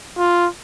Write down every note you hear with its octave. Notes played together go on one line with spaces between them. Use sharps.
F4